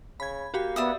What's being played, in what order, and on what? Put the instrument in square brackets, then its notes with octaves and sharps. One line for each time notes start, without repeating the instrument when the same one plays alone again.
[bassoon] C#3 [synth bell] B5 G#6
[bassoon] A#3 [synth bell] F#4 G4 B5
[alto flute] B3 [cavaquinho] D5 E5 D#6